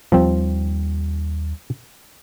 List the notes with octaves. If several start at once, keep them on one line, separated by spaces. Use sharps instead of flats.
D#2 F3 G3 C4